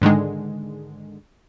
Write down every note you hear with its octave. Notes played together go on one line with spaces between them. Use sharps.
G#2 D3 D#3 G#3